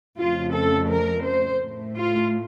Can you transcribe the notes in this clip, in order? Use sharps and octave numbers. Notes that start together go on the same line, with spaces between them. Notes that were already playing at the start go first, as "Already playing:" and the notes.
F2 C#3 F3 A3 F4
A4
A#4
C5
A2
A3
F4